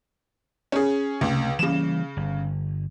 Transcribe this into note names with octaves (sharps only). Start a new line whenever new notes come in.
C#4 G#4
C#2 C3 A3
C#3 E3 G3 A#3 E7
G1